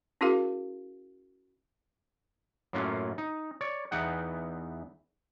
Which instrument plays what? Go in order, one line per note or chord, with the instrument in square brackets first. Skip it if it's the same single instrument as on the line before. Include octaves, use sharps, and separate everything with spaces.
[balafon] C#4 E4 F#4 G#4 A#4 F5
[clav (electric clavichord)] F#2 A2 F#3 A#3 C#4 F4
D#4
C#5 D5
E2 E3 B3 D#4 F#5 G5